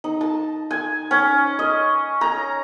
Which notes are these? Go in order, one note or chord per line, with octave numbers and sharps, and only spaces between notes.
D#4
A5
G#5
C#4
D#5
A#5